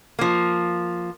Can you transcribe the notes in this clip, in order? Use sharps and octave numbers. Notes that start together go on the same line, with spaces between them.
F3 A#3